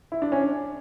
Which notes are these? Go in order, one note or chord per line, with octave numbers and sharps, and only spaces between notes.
E4
D4
C#4
D4